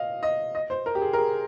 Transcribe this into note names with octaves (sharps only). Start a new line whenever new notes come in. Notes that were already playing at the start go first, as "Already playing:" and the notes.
Already playing: D#5 F5
D#5
D#5
C5
A#4
G4
G#4
A#4
G#4